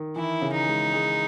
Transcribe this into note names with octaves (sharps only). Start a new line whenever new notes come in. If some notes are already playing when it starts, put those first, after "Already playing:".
Already playing: D#3
E3 E4
C#3
D#4
G#3
G#3